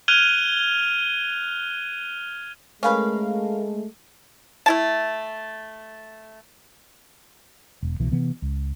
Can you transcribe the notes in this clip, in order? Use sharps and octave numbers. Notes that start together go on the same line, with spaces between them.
F6 F#6 G#6 D#7 F7 G7
G#3 A3 C#4 A#4 B4 F5
A3 E4 A5
E1
C2 B2 E3
C3 E3 B3
C#2